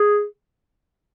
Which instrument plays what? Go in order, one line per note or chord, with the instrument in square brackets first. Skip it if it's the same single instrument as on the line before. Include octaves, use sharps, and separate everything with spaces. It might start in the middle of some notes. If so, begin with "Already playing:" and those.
Already playing: [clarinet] G#4